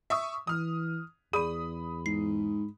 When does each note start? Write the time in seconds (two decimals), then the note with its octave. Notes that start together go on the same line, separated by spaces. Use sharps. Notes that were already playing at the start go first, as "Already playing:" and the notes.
0.10 E5 C#6 D#6
0.47 E3 D#6 F6
1.33 E2 G#4 D5 B5 D#6 D#7
2.06 G#2 C7